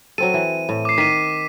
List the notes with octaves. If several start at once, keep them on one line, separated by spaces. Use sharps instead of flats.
F#3 C4 A4 D#7
E3
A2
D6 C7
D#3 B6 D#7